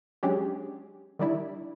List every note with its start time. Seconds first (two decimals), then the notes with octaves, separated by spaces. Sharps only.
0.23 F#3 G#3 C#4 D4 G4 G#4
1.19 D#3 G3 D4 E4